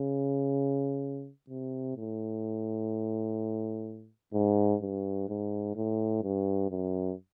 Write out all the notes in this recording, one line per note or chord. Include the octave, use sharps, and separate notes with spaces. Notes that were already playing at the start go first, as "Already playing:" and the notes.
Already playing: C#3
C3
A2
G#2
G2
G#2
A2
G2
F#2